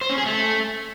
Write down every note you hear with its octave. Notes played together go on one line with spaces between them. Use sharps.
C5
C#4
G#4
A3